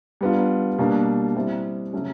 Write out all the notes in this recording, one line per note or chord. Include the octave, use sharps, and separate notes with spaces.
G3 B3 D4 F4
B2 G3 A#3 D4
G3 C4 E4
C#3 F#3 A3 C#4